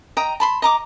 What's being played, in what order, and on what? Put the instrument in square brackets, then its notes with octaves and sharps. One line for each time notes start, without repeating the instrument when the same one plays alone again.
[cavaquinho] D#5 G5 A#5
A5 B5 C6
D#5 A#5 D6